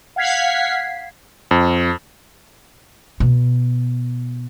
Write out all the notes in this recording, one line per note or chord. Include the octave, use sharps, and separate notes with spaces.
F5 F#5 G#6 B6 C7
F2
B2